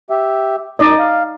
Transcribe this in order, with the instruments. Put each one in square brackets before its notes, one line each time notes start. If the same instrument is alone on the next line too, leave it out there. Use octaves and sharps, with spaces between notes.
[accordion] G4 E5
[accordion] F#2 [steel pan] D#4 D5 D#5
[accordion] F5